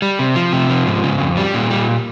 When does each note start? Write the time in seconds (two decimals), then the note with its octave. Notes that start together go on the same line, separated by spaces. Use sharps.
0.02 G3
0.19 C3
0.35 F3
0.53 C3
0.70 F3
0.87 G#2
1.04 C#3
1.20 F2
1.37 G3
1.54 A#2
1.70 G3